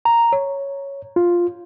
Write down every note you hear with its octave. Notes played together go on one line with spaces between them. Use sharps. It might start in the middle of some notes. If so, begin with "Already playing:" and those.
A#5
C#5
F4